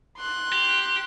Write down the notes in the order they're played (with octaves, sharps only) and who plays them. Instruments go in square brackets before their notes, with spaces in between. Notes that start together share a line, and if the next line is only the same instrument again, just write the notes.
[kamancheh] C6 F#6
[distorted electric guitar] G4